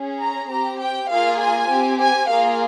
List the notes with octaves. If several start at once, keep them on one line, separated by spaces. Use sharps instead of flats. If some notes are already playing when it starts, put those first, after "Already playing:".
Already playing: C#4 G#4
A#5
C4 G4 A#5
G5
A#3 F4 G#4 F5
G#5
C4 G4
G#5
A#3 F4 G#4 F5